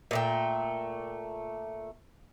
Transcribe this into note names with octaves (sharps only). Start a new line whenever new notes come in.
A#2 A3 G5